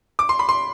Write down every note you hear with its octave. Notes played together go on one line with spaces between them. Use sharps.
D6
C6
B5
C6